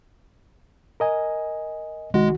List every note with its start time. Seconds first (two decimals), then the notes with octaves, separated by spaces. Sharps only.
1.00 A#4 D#5 G#5
2.14 C2 D#3 G#3 F#4